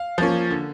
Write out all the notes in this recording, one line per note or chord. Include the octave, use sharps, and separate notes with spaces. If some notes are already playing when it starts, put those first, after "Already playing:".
Already playing: F5
F3 A#3 C#4
D3